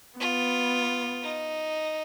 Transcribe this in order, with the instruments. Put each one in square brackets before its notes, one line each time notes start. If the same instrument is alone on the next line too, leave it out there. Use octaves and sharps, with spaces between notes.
[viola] B3 [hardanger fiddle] F4
[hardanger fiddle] D#4